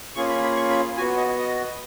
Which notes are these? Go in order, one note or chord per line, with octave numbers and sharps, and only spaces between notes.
A#3 C#4 F4 G#4 C#6
B5
B5
C#6
B5
B3 F#4 G#5
D#5
D#5